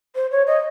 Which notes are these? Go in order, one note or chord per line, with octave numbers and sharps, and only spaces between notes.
C5
C#5
D#5